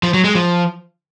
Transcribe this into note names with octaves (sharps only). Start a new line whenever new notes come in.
F3
F#3
G#3
F3